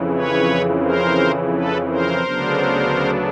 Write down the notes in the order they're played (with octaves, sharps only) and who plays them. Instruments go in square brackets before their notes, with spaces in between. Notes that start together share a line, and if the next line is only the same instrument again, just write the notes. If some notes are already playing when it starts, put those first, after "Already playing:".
Already playing: [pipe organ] F2 C#3 E3
B4 C#5
A#4 C5
A4 B4
A#4 C5
D2 C#3 F#3 B3 D4